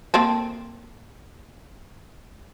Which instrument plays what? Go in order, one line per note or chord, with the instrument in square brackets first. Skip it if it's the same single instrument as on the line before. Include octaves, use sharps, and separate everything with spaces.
[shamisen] A#3 C4 A4